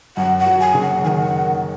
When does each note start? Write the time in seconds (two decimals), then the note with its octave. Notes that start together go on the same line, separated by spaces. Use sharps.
0.17 F#2 F#5
0.38 F#5
0.46 F#3
0.60 G#5
0.74 F#1
0.82 F#5
1.04 D#3 G#5
1.08 F#5